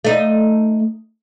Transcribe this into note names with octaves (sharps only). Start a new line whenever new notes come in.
A3 D#4